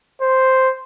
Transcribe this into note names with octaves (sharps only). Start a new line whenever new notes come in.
C5